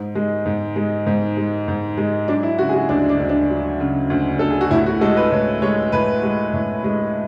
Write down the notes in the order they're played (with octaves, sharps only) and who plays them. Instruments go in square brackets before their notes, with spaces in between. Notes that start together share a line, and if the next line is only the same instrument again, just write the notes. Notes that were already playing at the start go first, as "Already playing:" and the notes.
Already playing: [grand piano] G#2
G#3
G#2
G#3
G#2
G#3
G#2
G#3
F#3 D4
E4
C#3 F#4
G#4
F#4
D2 D4
D4
D2
D4
F#3
C#3
D2
D2 A4
G#4
F#4
A2 E4
F#4
G#3 A4
B4
A2 C#5
G#3 C#5
A2 B4
G#3
A2
G#3